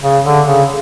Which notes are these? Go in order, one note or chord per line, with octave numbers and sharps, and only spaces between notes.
C#3
D3
C#3